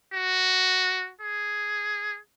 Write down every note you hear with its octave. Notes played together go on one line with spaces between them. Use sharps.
F#4
G#4